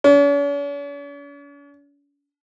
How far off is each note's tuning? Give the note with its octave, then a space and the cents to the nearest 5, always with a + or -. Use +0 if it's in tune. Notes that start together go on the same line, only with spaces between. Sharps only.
C#4 +45